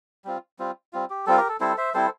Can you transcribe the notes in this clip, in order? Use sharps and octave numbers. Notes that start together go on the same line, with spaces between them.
G3 C4 F4
G3 C4 F4
G3 C4 F4
G4
G3 C4 F4 A4
G4 A#4
A4
G3 C4 E4 A4 C5
C5 E5
G3 C4 E4 A4 C5